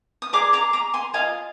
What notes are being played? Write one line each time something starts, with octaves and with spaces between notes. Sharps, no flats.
D#6
G#4 D5 A#5 D6
A#5 D6
A#5 D6
G#5 C6
F4 A#4 D#5 F5 G#5